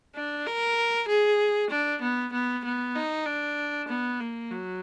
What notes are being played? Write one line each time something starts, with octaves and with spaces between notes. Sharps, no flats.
D4
A#4
G#4
D4
B3
B3
B3
D#4
D4
B3
A#3
F#3